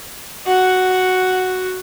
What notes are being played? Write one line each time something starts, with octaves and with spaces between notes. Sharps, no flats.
F#4 F#5